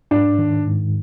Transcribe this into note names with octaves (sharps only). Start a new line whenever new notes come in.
G#2 D4
D#3
G#2